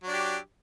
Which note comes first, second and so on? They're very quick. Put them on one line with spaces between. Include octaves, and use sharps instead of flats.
F#3 D4 G4